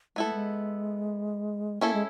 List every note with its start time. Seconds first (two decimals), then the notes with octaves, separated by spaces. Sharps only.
0.16 G#3 B3 E4 A4
0.25 A3
0.33 G#3
1.81 A#3 C#4 E4 A4
1.94 G#3